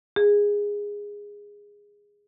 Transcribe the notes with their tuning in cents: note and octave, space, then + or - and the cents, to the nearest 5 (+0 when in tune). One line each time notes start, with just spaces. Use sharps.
G#4 -15